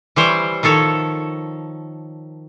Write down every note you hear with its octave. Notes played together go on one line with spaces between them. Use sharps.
E3 G3 C5 C#5 G5
D#3 F3 A4 C#5